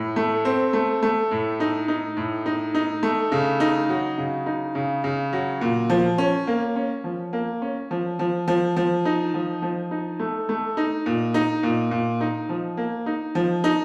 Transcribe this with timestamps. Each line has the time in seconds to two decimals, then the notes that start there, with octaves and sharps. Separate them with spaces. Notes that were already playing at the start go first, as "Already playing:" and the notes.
Already playing: A2
0.16 A3
0.45 C4
0.73 A3
1.03 A3
1.31 A2
1.60 D#4
1.88 D#4
2.17 A2
2.46 D#4
2.75 D#4
3.03 A3
3.32 C#3
3.60 D#4
3.89 F#3
4.18 C#3
4.46 D#4
4.75 C#3
5.04 C#3
5.33 F#3
5.61 A#2
5.90 F3
6.18 C#4
6.47 A#3
6.76 C#4
7.04 F3
7.33 A#3
7.62 C#4
7.91 F3
8.19 F3
8.48 F3
8.76 F3
9.05 D#4
9.34 F3
9.62 F3
9.91 D#4
10.19 A3
10.49 A3
10.77 D#4
11.06 A#2
11.34 D#4
11.63 A#2
11.91 A#2
12.21 D#4
12.49 F3
12.77 A#3
13.06 D#4
13.35 F3
13.64 D#4